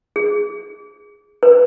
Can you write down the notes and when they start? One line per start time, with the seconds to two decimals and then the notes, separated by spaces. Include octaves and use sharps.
0.16 G#4
1.43 B4